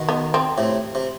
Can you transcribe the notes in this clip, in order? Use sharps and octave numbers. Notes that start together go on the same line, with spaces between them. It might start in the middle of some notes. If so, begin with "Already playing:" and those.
Already playing: B2 D#3
B3
C4
A2 C3
C3